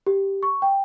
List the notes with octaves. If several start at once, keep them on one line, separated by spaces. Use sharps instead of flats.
G4
C#6
G5